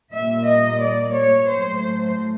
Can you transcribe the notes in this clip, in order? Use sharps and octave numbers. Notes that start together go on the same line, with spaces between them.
A#2 G3 A#3 E5
D#5
D5
C#5
A2 F#3 A3 C5